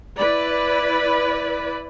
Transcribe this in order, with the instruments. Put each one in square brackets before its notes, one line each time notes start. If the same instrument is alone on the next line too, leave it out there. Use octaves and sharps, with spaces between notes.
[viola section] E4 B4 D5 B5